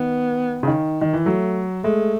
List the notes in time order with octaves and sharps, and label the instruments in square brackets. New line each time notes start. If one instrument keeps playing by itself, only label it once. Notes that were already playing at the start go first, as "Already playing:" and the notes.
Already playing: [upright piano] D#3 [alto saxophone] B3
[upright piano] C#3
D#3
D#3
E3
[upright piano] F#3 [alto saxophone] A3
[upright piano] G#3 [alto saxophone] A3